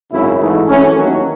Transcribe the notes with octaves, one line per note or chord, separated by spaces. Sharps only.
G#1 F#2 C#3 E4
G#2 E3 A3 D#4
F#2 E3 A3 C#4
D#2 D#3 F#3 C#4